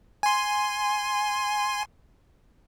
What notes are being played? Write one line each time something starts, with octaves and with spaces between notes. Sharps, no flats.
G#5 C6